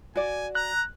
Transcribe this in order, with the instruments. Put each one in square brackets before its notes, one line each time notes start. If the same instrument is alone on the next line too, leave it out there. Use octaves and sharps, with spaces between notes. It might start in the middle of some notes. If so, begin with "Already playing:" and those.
[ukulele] F#4 D5 [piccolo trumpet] G#5
[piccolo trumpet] A#5 [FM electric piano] F#6